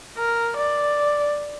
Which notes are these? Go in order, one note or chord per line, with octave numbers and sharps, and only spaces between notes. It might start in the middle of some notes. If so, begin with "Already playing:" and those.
A#4
D5